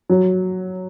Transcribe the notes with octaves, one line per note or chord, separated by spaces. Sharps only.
F#3